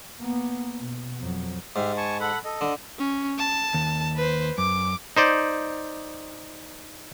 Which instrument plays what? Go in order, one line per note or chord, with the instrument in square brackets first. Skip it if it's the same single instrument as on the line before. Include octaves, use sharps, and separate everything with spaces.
[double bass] A#3 B3
B2
F2 F#3
[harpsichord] G#2 [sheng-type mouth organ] G4 E5 F6
[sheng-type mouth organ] G#5 A5 C#6
A4 F#5 B5
A4 D#5
[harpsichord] D3
[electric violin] C#4
A5
[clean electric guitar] D#2
[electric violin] B4 C5
[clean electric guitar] F#2 [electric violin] D6
[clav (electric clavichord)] D#4 C5 D5